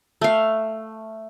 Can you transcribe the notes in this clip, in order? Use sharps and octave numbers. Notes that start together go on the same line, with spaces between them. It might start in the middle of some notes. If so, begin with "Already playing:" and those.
A3 F5